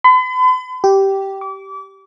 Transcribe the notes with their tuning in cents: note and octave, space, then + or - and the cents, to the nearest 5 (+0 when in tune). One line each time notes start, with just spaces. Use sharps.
B5 +45
G4 -10
D6 -30